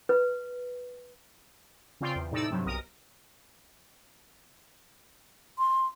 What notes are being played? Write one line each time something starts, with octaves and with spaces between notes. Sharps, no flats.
B4
C#3 C4 F4 D5 G5 C6
E2
A2 C3 D#4 A4 D5 E6
G2 C3 F#3
B1 A#4 D#6
C6